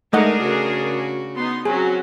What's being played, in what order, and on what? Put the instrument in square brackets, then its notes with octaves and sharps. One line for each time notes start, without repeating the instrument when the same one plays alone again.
[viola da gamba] G#3 D#4 [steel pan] A3 D#5 F#5 [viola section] D4 G#4 A#4
[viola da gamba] C#3 F#4
[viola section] B3 D#4 C6
[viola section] F#3 C#4 F#4 [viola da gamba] C4 [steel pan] G#4